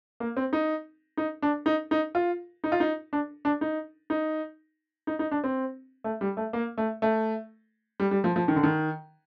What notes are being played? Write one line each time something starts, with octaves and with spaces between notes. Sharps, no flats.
A#3
C4
D#4
D#4
D4
D#4
D#4
F4
D#4
F4
D#4
D4
D4
D#4
D#4
D#4
D#4
D4
C4
A3
G3
A3
A#3
A3
A3
G3
G3
F3
F3
D#3
D3
D#3